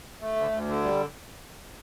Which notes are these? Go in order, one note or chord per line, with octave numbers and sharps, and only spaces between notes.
A3
D2
D2
D3
G3